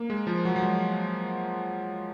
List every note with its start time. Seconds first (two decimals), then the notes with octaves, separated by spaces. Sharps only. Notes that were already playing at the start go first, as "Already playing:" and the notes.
Already playing: A#3
0.10 G#3
0.27 F3
0.45 F#3
0.56 F#3
0.62 G#3